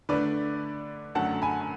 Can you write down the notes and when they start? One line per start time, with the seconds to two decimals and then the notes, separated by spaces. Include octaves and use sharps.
0.09 D3 A3 D4 B4 D5
1.15 F#2 D3 F#3 A3 F#5 A5
1.42 G#5 B5